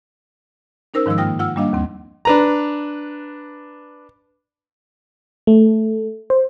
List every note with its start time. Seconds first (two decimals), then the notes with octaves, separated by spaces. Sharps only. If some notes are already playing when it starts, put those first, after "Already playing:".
0.94 C#4 D#4 A#4 C5 E6
1.06 G#2 D#3 F3 G#3 E6
1.18 G2 A#3 F4 G5 D#6 A#6
1.39 F4 F#5 E6
1.56 G3 A#3 D4 D#5 F5
1.73 D#2 C4
2.25 D4 B4 A#5
5.47 A3
6.30 C5